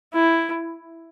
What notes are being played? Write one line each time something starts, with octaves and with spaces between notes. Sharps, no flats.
E4